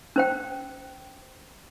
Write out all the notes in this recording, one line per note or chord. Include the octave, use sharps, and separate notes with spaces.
C#4 C5 G5